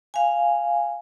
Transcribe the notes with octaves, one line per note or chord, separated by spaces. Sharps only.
F5 G#5